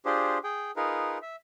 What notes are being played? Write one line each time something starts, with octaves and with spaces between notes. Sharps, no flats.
D4 F4 G4 G#4 C5
G#4 G5
D#4 F4 G#4 A#4 B4
E5